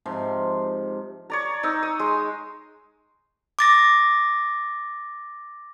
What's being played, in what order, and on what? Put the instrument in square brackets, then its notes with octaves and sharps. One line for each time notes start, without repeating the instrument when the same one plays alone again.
[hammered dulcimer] G#2 C3 F3 C6
[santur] C#5 D5 A#5
D#4 E6
D#6
G#3
[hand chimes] D6 A6 A#6